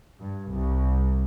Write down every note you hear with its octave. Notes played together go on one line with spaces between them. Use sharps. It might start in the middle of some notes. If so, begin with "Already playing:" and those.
G2
C2